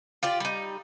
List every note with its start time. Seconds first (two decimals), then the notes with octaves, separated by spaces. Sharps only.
0.23 F4 G4 D5
0.40 G3 D#4